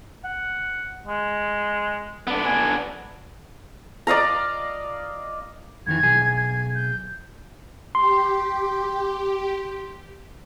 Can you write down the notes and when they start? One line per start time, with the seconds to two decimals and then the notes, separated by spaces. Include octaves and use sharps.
0.24 F#5
1.07 G#3
2.27 B3 D4
2.45 G#5
4.07 D5 D#5 F5 A#5
5.87 F2 D#3 E3 G#6
6.03 B1 G#4
6.37 G#6
6.75 G6
7.95 G4 C6